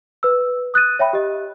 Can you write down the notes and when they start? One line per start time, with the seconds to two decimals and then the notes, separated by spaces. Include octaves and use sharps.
0.23 B4 E6
0.74 D#6 F#6 A6 D#7
0.99 C#5 E5 G5 B5
1.13 G4 D#5